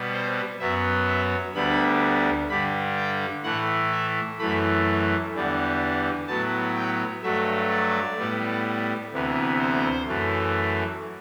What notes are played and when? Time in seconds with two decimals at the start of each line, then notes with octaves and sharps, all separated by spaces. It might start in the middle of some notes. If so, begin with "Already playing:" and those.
Already playing: B2 G3 B3
0.13 C5
0.59 F#2 F#3 B3 E5
1.07 E5
1.54 D2 D3 G3 B3 B5
2.49 G2 D3 G3 B5
2.96 G5
3.43 A2 E3 A3 F#5
3.92 E5
4.39 F#2 E3 A3 B5
5.33 E2 D3 G3 B3
6.28 A2 F#3 B3 A5
6.76 G5
7.23 G2 F#3 A3 E5
7.70 D5
8.17 A2 G3 B3
9.12 D2 C3 E3 B3
9.59 C5
10.07 F#2 E3 A3